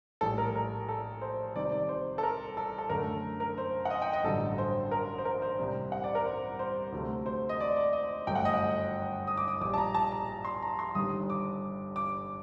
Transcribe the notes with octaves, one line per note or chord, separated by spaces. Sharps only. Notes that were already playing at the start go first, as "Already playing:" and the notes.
A#1 A2 G3 A4
A#4
A#4
A4
C5
C2 C3 D#3 D5
D5
C5
A4
A#4
A4
A4
F#2 D3 A3 A#4
A#4
C5
F#5
D#5
G5
D#5
A1 G2 D3 F#3 A4
C5
A#4
C5
A#4
C5
C2 C3 G3
F#5
D5
A#4
C5
C5
D2 C3 F#3 A3
C5
D#5
D5
D5
D#5
G1 F#2 F#3 A3 G5
F#5
D#5
F#5
D#6
D6
D#6
A#1 A#2 G3 D6
A5
A#5
A5
A#5
C6
A#5
C6
G1 G2 D#3 G3 D#6
D6
D6